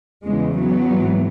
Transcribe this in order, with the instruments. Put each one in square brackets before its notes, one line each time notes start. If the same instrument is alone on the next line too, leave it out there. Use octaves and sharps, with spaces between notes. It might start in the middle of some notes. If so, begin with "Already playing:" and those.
[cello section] E2 C#3 E3 G#3
F#3 B3
G#2 E3